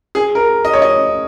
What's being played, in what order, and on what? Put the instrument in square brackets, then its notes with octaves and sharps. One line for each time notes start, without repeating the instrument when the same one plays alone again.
[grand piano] G#4
A#4
D#5
C#5
D#5